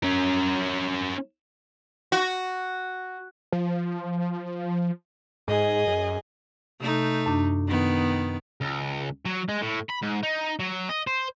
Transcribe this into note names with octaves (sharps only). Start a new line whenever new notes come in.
C#4 A#4
F#4
F3
G#2 G#4 D#5 G#5
F#2
C3 A3 D#4
F#2 D4
D#3 B3
C#2
F#3
G#3
A2
B5
G#2
D#4
F#3
D#5
C5